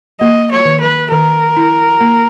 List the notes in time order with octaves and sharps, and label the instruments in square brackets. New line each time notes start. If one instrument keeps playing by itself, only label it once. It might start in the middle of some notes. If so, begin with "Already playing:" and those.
[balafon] A#3 [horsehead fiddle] D#5
[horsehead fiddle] C#5
[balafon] D#3
[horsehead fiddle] B4
[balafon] D#3 [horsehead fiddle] A#4
[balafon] E4
A#3